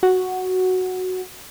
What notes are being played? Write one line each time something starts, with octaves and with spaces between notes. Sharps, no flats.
F#4